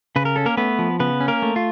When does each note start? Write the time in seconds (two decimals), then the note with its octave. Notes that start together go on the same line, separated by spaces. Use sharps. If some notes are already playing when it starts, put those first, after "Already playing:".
0.16 C#3 B4
0.25 A#4
0.36 C#4 A4
0.46 A#3 A#4
0.57 A3 B3 B4
0.79 F3
1.00 C#3 B3 B4
1.21 C#4
1.28 A#3 A#4
1.42 A3
1.56 F4